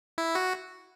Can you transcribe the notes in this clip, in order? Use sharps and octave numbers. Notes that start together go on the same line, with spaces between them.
E4
F#4